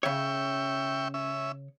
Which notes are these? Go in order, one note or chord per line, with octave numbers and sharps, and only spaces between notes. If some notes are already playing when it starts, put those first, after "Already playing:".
C#3 C#5 E5 G5 C#6
C#4 E5